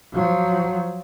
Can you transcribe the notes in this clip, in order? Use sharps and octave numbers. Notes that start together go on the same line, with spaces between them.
F3 F#3